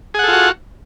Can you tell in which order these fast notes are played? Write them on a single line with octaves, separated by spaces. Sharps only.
G#4 F#5 A4 F4 F#4